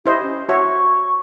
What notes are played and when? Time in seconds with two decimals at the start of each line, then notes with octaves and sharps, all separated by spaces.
0.06 E4 G4 C5 D#5
0.22 C#4
0.49 F#4 C#5 E5 C#6